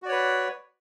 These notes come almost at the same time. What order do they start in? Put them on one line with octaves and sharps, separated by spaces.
F#4 D5 C#5 B4